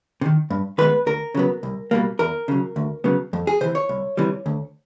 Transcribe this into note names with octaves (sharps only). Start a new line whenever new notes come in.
C3
D#3
G2
D#3 G#3 B3 B4
D2 A#4
C#3 F#3 B3
C2
B2 G3 A#3
E2 A#4
C#3 F#3
D2
C#3 F#3 B3
F2
G#4
C3 E3 C5
C#5
C2
C3 E3 G3
D2